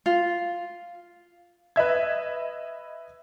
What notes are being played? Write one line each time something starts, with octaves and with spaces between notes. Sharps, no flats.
F4
B4 D#5 E5 G#6